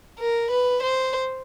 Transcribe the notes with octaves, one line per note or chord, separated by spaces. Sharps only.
A#4
B4
C5